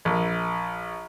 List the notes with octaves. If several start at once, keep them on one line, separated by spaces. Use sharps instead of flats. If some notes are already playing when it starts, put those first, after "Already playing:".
A#1